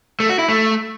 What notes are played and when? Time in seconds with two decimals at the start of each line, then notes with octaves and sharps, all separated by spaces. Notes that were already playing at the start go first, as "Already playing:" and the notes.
0.20 A3
0.29 F#4
0.39 E4
0.48 A3